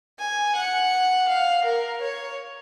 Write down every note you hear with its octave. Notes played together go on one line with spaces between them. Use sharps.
G#5
F#5
F5
A#4
C#5